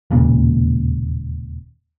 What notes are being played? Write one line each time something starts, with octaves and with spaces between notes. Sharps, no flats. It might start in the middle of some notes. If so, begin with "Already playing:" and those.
E1 D#2 A#2 C#3